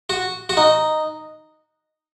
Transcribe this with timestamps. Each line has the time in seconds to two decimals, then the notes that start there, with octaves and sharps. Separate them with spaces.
0.10 F#4
0.49 F#4
0.57 D#4